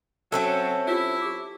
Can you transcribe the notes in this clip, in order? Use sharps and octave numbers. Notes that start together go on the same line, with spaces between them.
F#3 C4 C#4 A4 E5
E4 F4 G4
G4 D6